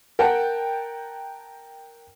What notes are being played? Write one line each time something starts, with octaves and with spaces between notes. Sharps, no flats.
A#4 F#5 G5 A5